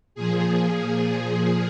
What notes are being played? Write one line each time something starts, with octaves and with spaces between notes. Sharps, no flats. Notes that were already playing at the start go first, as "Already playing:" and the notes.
A#2 F3 G#4